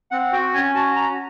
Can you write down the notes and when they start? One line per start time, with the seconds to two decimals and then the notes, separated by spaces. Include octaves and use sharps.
0.11 C4 F#5
0.33 F#4 G5
0.54 C#4 G#5
0.74 F#4 A5
0.95 F#4 A#5